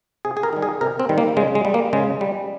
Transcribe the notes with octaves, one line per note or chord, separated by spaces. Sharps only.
C3 G#4
G#4
A#4
D#3 G3
G#4
C3 A#4
C4
D#3 G3
A#3
C#3 G#3
G#3
G3
A#3
C#3 G#3
G3